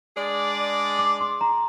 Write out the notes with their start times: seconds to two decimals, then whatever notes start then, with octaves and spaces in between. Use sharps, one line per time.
0.15 G#3 D4 G#4 D5
0.99 D6
1.21 C6
1.41 A#5